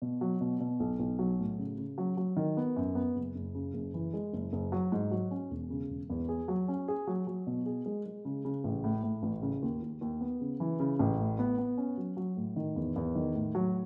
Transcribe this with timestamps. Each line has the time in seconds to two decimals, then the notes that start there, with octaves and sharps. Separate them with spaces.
0.02 B2
0.21 F#3
0.41 B2
0.60 B2
0.80 B1
0.99 B1
1.19 F#3
1.39 A2
1.59 C#3
1.78 C#3
1.98 F#3
2.17 F#3
2.37 D#3
2.57 B3
2.76 F#2
2.95 B3
3.16 F#1
3.35 F#1
3.55 C#3
3.74 F#1
3.94 E3
4.14 G#3
4.33 F#1
4.53 F#1
4.72 F#3
4.92 G#2
5.11 F#3
5.31 C#4
5.51 E1
5.70 C#3
5.90 E1
6.10 E2
6.29 G#4
6.48 F#3
6.68 C#4
6.88 G#4
7.07 F#3
7.27 F#3
7.47 B2
7.66 G#4
7.86 G#3
8.06 G#3
8.25 C#3
8.45 C#3
8.64 A1
8.84 A2
9.03 A2
9.23 A1
9.42 C#3
9.62 D#2
9.82 D#2
10.01 D#2
10.21 B3
10.41 C#3
10.60 E3
10.80 C#3
10.99 A1
11.19 A2
11.39 B3
11.58 B3
11.78 C#4
11.97 F#3
12.17 F#3
12.36 A2
12.56 D#3
12.76 E2
12.96 E2
13.15 D#3
13.35 A2
13.55 F#3